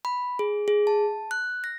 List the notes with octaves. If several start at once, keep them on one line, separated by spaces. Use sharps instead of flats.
B5
G#4
G#4
A5
F#6
A#6